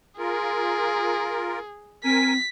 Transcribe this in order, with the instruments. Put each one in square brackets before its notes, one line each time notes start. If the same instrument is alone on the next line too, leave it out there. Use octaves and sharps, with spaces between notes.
[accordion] F4 A#4 [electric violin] G#4
[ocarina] C4 [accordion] A#4 G#5 [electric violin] B6